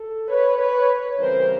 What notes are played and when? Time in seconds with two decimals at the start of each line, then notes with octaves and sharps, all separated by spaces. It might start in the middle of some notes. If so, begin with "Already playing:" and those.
Already playing: A4
0.28 B4 C#5
0.58 B4 C#5
1.18 C#3 E3 G3 C4 A#4 C5